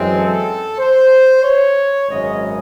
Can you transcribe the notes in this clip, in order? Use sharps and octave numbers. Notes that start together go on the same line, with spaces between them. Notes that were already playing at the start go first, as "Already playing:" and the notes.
Already playing: F#2 E3 G#3 C4
A4
C5
C#5
G#1 F#2 C#3 G#3 D#5